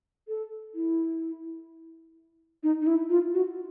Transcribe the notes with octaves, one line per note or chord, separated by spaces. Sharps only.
A4
E4
D#4
D#4
E4
F4
F#4